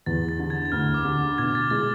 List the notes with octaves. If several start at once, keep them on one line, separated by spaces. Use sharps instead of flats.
E2 A6
A6
D3
G#6
G#6
D2 F6
D6
D3
B2 G#6
A6
G#3 A6